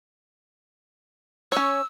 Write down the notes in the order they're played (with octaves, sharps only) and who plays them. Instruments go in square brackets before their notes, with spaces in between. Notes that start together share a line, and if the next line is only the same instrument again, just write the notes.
[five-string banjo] C#4 C#5 [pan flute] E6